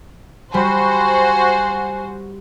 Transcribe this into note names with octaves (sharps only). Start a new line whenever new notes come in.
G3 F#4 C5 G#5